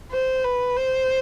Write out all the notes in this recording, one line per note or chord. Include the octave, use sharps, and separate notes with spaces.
C5
B4
C5